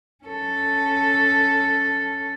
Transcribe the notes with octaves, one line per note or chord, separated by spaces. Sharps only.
C#4 A4